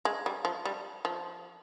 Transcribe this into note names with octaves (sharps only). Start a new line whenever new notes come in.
G#3
G3
F3
G3
F3